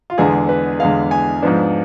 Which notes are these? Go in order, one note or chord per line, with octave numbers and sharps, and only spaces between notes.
F4
E2 D3 G#3 B3 G#4
B4
E2 D3 G#3 B3 F5
G#5
G#2 F3 B3 D4